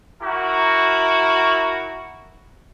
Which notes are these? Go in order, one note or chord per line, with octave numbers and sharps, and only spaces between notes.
E4 F#4 A#4